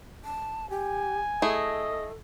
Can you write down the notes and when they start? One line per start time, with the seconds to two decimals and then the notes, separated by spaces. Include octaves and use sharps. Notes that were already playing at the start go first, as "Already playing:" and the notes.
0.25 A5
0.70 G4 G#5
1.42 A3 E4 G#4 A4 D#5